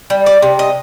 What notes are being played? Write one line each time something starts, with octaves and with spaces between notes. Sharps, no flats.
G3
D5
C3
D#5